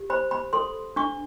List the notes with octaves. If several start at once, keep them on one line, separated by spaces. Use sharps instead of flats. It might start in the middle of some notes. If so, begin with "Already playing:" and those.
Already playing: G4
C5 B5
B5
A4 C6
D4 C#6